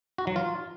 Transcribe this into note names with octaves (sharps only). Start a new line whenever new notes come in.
F#4
F#3
F4